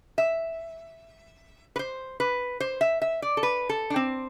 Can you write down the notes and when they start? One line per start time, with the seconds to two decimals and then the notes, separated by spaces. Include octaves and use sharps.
0.18 E5
1.76 B4
1.79 C5
2.20 B4
2.60 C5
2.81 E5
3.02 E5
3.22 D5
3.37 A4
3.43 B4
3.69 A4
3.90 D4
3.96 C4